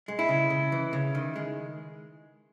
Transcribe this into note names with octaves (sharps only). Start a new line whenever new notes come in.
G#3
E4
C#3
C#3
E3
C#3
D#3
G#3